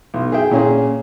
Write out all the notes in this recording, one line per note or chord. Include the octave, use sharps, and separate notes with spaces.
B1
G#4 E5 G5
A#2 C#4 G#4